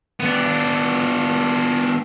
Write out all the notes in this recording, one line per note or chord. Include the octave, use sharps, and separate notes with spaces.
B3 D4